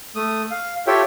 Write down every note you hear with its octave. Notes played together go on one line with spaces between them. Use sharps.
A3 D#6
F5
F4 G4 A4 C#5 E5 G5